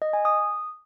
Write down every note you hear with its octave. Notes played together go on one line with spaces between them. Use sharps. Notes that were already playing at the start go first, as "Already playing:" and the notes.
D#5
G#5
D#6